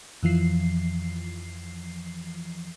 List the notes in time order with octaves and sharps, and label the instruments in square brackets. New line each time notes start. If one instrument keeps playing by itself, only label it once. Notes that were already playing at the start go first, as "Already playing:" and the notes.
[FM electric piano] F2 E3 F3 C7